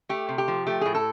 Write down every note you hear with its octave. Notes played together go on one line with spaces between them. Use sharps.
A3 G4
C3
G4
F3
A3 G4
A2 G#4
A4